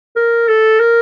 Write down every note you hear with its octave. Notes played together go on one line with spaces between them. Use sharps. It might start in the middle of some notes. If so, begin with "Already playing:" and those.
A#4
A4
A#4